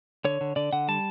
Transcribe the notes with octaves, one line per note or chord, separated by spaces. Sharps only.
D3 C#5
D3
D3 D5
D3 F#5
G3 A5